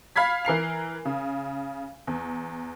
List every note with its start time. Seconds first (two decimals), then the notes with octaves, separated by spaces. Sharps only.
0.16 F5 B5 G#6 B6
0.45 E3 A#4 C7 F7
1.05 C#3
2.07 E2